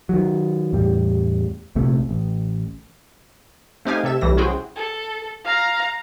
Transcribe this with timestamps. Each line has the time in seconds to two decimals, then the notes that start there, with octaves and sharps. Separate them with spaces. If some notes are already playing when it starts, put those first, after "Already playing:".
0.09 D#3 F#3
0.73 E2 A2 G3
1.75 A#1 F2 C3 A3
2.09 A1
3.85 A3 C4 D#4 G4 F5 G#5
4.04 C3 A4 E5 E7
4.21 B1 E3 G3 A3 A#6
4.37 C#4 E4 F#4 G#4 C5 G5
4.76 A4
5.45 F5 A#5